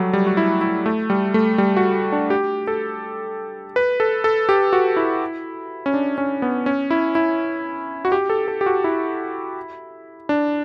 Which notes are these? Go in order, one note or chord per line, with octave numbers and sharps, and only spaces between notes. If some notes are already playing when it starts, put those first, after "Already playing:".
Already playing: F#3 G3 A3
G3
F#4
E4
E4
A3
G3
A3
G3
F#4
D4
G4
A4
B4
A4
A4
G4
F#4
E4
C#4
D4
C#4
B3
C#4
E4
E4
F#4
G4
A4
A4
G4
F#4
E4
D4